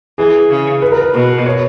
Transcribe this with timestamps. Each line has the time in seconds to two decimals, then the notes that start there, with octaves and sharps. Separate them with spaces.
0.18 E3 G#4
0.50 C#3
0.82 B4
0.92 A#4
1.01 B4
1.13 B2
1.46 C#5